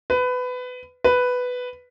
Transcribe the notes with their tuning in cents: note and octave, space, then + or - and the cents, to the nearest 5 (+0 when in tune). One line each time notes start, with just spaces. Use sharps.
B4 +20
B4 +5